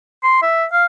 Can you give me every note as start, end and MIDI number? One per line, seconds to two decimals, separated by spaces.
0.24 0.41 84
0.42 0.65 76
0.73 0.85 77